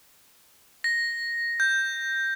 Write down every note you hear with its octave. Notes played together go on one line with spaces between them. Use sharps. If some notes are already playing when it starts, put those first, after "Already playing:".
A#6
G6